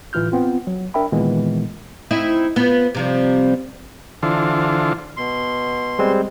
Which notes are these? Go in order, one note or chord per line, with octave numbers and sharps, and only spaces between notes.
G1 A2 E3 F4 F6 G6
B3 C4 F4
F#3
D4 A#4 E5 G5 B5
A#2 D#3 E3 G#3 B3
C4 D#4 E4
F3 B3
C3 F3 G3
D3 E3 F4 A4 C5
B2 C6
G3 G#3 C4